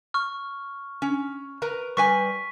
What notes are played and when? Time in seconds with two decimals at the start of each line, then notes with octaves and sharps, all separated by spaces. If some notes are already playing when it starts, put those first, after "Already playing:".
0.14 C#6 F6
1.02 C#4
1.62 A#4 B4 A#5
1.97 G3 B4 G#5 C#6 B6 D#7